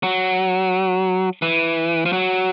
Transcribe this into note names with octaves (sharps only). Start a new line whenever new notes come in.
F#3
E3
F3
F#3